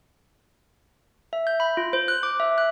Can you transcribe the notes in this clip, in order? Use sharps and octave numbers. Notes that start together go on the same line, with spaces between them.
E5
G6
B5
F4
C5
F#6
D6
E5
F#6